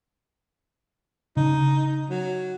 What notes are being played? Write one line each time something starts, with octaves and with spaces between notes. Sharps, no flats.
C#3 D4 D#4
F#3